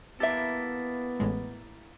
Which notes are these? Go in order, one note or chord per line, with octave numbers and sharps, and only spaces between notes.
A#3 B3 E4 G4 A4 E5
A1 A2 G#3